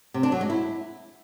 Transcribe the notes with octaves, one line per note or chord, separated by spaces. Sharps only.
C3
D4
F#3
G#3
E4